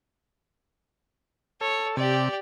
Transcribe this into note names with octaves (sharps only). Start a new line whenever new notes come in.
A4 C#5
C3 G4 D5